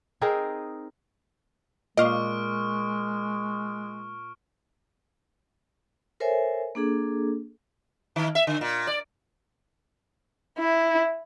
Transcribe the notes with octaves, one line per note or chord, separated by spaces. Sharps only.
C4 D#4 G#4 A#4
A#2 G#3 D#5 F5 C#6 F6 D7
A4 A#4 C5 C#5 E5 G#5
A#3 D4 G#4 A4
D#3
E5
D3
A#2
D5
E4